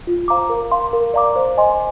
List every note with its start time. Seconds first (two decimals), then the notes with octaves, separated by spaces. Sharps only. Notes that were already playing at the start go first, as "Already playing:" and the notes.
0.07 F4
0.28 C5 F5 A#5 D6
0.49 A#4
0.71 F5 C6
0.93 A#4
1.14 D5 F5 A#5 D6
1.36 C5
1.57 D#5 G#5 C6